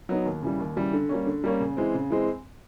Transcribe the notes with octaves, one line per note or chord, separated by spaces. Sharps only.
F#3 B3 D#4
D#2
C#3 E3 G3
D#2
C#3 E3 G3
D3
G3 A#3 C#4
D3
G3 A#3 C#4
C#3
E3 G#3 C4
C#3
E3 G#3 C4